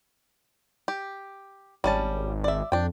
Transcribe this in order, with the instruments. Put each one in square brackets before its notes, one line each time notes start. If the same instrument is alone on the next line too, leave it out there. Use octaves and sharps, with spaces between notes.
[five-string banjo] G4
[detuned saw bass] G#1 [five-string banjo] G3 C#4 A5
[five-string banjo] D5 E5
[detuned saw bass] F2 [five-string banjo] D4 G5